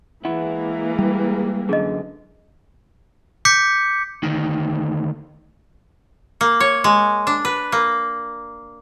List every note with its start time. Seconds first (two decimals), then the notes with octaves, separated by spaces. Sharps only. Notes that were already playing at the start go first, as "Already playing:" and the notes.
0.25 E3 G#3 A#3 E4 E5 F#5
0.99 G3
1.69 F#2 D3 G#4 D#5
3.45 D6 G6 B6 C#7
4.23 D2 D#3
6.41 A#3
6.60 C#5
6.84 G#3
7.27 D4
7.45 B4
7.72 A#3